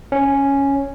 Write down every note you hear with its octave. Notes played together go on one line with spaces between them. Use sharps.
C#4